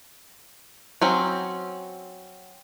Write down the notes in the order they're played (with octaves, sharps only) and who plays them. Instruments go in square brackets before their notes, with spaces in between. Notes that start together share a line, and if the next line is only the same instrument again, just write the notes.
[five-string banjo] F#3 C4 C#4